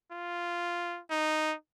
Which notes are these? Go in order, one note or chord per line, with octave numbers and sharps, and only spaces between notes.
F4
D#4